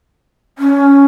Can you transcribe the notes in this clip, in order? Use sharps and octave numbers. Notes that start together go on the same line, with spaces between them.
C#4